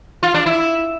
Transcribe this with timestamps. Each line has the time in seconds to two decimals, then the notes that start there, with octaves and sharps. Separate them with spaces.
0.23 F4
0.34 D4
0.46 E4